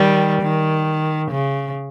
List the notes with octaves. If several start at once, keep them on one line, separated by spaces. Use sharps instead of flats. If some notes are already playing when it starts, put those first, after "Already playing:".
Already playing: D#3 G3
D#3
C#3